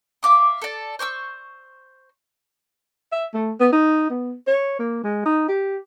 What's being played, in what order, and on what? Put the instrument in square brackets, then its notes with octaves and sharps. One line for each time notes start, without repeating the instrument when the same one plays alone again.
[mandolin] E5 F5 D6 D#6
A4 D5
C5 C#6 D6 E6
[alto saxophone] E5
A3
B3
D#4
B3
C#5
A#3
G#3
D#4
G4